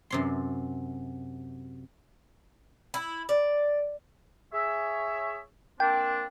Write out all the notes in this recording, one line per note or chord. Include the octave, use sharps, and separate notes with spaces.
F#2 C3 C6
E4
D5
G#4 C#5 E5
A#3 C4 D4 G5